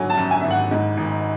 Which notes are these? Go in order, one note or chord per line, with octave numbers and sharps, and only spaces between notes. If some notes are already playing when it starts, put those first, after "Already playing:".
Already playing: G#1 D3 F#3 G#5
A5
F#2
G#5
G#1 E5
F#5
G#2
G#1